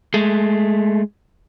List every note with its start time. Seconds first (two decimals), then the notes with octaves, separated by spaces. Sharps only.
0.14 G#3 A3